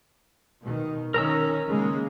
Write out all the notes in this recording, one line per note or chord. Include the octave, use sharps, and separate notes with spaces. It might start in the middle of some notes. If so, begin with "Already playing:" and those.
B2 D#3
D#3 C#4 A#4 A#5 E6
C#3 G#3 A#3